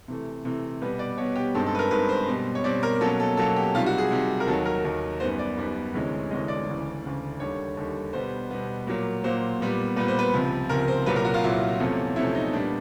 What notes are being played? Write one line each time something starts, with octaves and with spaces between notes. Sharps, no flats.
C3 E3 A3
C3 E3 A3
B2 G3 B3 B4
D5
B2 G3 B3 C#5
G4
G2 D#3 G#3 C4 A4
A4
B4
A#4
G2 D#3 G#3 C4 B4
C5
B2 G3 C4
C#5
B2 G3 C4 D5
A#4
B2 F#3 A#3 C#4 A4
A4
B2 F#3 A#3 C#4 A4
G4
C3 D#3 G3 F4
F#4
G#4
C3 D#3 G3
A#4
D#2 D#3 F#3 A4
A#4
D#2 D#3 F#3
F#2 D#3 G3 B3 C5
D5
F#2 D#3 G3 B3
D2 C3 E3 G#3 C#4
D2 C3 E3 G#3 C#4 D#5
D5
D2 C#3 E3
D2 C#3 E3
D#2 D3 G3 C#5
D#2 D3 G3
B2 G3 B3 C5
B2 G3 B3
A#2 F#3 A#3
A#2 F#3 A#3 C5
A#2 G3 B3
A#2 G3 B3 B4
C5
B4
C#2 C3 F3
C#2 C3 F3 A#4
C5
C2 A#2 F#3 B4
A#4
F#4
F4
C2 A#2 F#3 E4
E2 C3 F3 A3 C#4
E2 C3 F3 A3 C#4 E4
D#4
A#2 G3 B3 D4